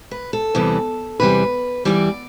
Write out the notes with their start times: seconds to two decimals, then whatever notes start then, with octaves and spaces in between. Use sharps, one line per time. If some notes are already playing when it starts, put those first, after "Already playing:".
0.11 B4
0.33 A4
0.55 E2 C3 E3 G3
1.20 E2 C3 E3 G3 B4
1.85 E2 C3 E3 G3 D5